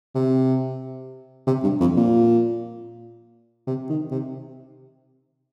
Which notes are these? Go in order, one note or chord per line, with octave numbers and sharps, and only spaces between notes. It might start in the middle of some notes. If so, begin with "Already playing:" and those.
C3
C3
G2
F2
A#2
C3
D#3
C3